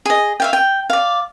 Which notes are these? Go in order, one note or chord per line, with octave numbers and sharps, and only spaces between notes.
G#4 D#5
E5 F5 G5
G5
D5 F5